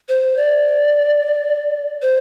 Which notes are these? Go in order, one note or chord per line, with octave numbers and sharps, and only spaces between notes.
C5
D5
C5